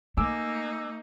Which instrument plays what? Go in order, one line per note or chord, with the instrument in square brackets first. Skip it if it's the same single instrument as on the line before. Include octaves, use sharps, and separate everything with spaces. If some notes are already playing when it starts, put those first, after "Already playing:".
[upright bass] A3 [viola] A#3 D#4 [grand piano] G#5 D6 E6